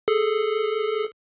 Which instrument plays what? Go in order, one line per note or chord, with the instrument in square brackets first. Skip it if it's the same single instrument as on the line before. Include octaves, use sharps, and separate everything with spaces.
[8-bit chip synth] G#4 A4